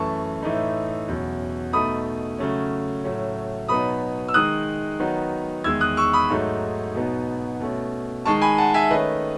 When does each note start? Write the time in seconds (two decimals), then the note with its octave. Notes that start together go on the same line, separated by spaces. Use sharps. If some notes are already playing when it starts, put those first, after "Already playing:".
Already playing: F#2 E3 A3 A5 C#6
0.43 A2 E3 A3 D#4
1.08 E2 B2 F#3 C#4
1.73 B2 A3 D#4 B5 D#6
2.38 C#3 F#3 A3 C#4
3.04 A2 F#3 A3 C#4
3.68 B2 F#3 B3 D#4 B5 D#6
4.28 E6
4.34 D#3 G#3 D#4 D#6 F#6
4.99 D#3 F#3 B3 D#4
5.64 E2 D#3 G#3 E6 G#6
5.80 D#6 F#6
5.97 C#6 E6
6.13 B5 D#6
6.30 G#2 F#3 A3 D#4
6.95 B2 F#3 B3 D#4
7.60 B2 A3 C#4
8.25 D#3 G#3 D#4 A5 C#6
8.42 G#5 B5
8.58 F#5 A5
8.74 E5 G#5
8.90 D#3 A3 C#4 B4 D#5